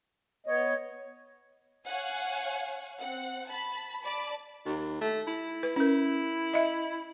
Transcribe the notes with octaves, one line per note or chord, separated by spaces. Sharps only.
B3 C#5 D#5
C#5 F5 F#5 G#5
C4 F#5
A5 B5
D5 A5 B5 D6
D#2
A3
E4
B4
C#4 E4 A#4
D#5 E5